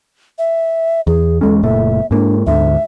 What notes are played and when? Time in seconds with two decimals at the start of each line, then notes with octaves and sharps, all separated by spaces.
0.38 E5
1.07 E2 G#4
1.41 E2 G#3 C#4 A4
1.63 F#1 A#2 A3 E5
2.11 G#2 A#3 D4
2.47 D2 G#2 D3 E5